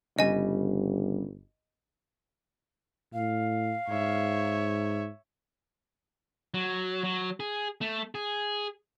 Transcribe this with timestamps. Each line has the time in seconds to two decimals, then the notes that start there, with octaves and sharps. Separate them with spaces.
0.19 G1 C#3 G3 D#5 G#5
3.14 A2 F5
3.89 G#2 C#5 E5
6.54 F#3
7.04 F#3
7.40 G#4
7.81 A3
8.15 G#4